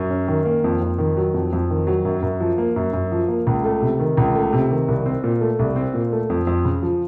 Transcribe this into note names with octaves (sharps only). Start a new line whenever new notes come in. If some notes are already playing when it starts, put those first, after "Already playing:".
Already playing: F#2
C#4
D#3
A#3
F2
F2
D#3
F#3
F2
F2
D#3
F#3
F#2
F#2
F3
A#3
F#2
F#2
F3
A#3
C#2
A3
C3
D#3
C#2
A3
C3
D#3
C2
C4
A#2
A3
C2
C4
A#2
A3
F2
F2
C#3
F3